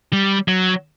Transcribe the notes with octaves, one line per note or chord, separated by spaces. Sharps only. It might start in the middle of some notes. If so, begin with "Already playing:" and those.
G3
F#3